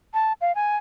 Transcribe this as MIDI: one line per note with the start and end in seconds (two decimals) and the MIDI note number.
0.14 0.33 81
0.41 0.54 77
0.55 0.76 80